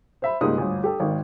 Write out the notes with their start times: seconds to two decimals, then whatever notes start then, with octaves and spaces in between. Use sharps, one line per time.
0.22 C5 E5 B5
0.41 C#2 G#2 G3 A#3 D#6
0.58 G1 D2
0.84 G4 A4
1.00 G#1 D#3